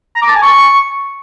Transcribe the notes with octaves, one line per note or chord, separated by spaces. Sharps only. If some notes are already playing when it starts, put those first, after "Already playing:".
A#5
D6
A5
G#5
C#6